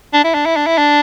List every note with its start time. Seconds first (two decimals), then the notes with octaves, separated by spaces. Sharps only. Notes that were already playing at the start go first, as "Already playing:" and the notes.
0.14 D4
0.24 E4
0.35 D4
0.46 E4
0.56 D4
0.67 E4
0.78 D4